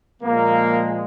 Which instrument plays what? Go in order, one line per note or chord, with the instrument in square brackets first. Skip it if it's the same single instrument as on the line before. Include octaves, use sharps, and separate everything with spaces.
[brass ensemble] A#2 F3 G#3 A#3